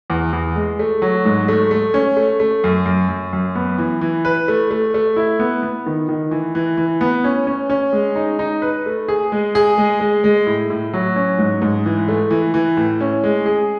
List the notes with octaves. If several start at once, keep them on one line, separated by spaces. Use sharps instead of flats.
E2
E2
G#3
A3
F#3
G#2
A3
A3
C#4
A3
A3
F#2
F#2
F#2
F#2
B3
E3
E3
B4
A3
A3
A3
E4
B3
B3
D#3
D#3
E3
E3
E3
B3
C#4
C#4
C#4
G#3
D#4
D#4
B4
A3
G#4
G#3
G#4
G#3
G#3
G#3
A2
A2
F#3
C#4
G#2
G#2
E3
A3
E3
E3
A2
C#4
G#3
G#4